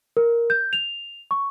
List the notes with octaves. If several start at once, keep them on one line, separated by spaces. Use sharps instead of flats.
A#4
G6
F7
C#6